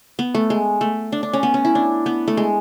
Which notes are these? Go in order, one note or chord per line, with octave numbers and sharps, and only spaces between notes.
B3
A3
G#3
A3
D4
D4
C#4
B3
C#4
E4
D4
B3
A3
G#3